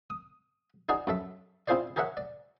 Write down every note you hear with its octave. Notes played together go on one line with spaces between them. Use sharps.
D#6
D#4 F#4 G#4 D5
F#2 A4 E5
C4 E4 F4 G#4 C5 D5
G4 G#4 A#4 C#5 E5 F#5
D5